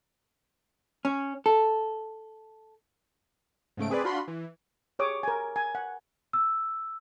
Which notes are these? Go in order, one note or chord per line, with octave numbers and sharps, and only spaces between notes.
C#4
A4
G#2 C#3 A3 D7
C4 G#4 B4 D5
D4 F4 F#4 B5 C6
E3
G4 G#4 C#5 D6 D#6
A#4 G#5
G#5
F#5
E6